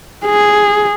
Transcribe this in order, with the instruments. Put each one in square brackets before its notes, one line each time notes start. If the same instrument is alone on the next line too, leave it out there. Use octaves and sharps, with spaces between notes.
[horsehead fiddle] G#4